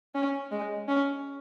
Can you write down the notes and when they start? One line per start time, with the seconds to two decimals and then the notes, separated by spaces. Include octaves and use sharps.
0.15 C#4
0.51 G#3
0.88 C#4